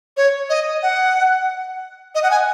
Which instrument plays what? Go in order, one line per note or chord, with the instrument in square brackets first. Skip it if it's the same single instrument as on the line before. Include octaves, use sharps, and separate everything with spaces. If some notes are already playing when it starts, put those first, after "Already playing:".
[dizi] C#5
D#5
F#5
D#5
F#5
G#5